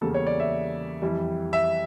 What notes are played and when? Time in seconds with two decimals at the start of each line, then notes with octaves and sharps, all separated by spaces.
0.01 E2 C#3 G3 A#3 A4
0.14 C#5
0.27 D5
0.40 E5
1.02 F2 E3 G3
1.53 E5